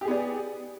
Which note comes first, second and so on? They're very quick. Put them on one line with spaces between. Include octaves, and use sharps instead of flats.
G4 G#4 B3 D5